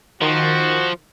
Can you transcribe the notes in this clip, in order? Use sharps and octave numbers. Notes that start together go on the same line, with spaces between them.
D#3 F3 F#4